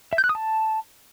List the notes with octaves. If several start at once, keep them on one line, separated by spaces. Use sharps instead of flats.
E5
G6
F#6
D#6
A5